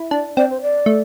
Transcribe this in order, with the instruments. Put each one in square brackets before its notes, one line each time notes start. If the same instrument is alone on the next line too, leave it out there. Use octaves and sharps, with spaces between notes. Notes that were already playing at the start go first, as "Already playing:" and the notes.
Already playing: [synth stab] E4
D4
[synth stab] C4 [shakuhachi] D5
[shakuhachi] C5
D5
[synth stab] A3